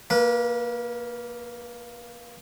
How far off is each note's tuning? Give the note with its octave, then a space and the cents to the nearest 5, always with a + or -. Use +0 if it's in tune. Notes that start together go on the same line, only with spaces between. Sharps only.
A#3 +0 B4 -35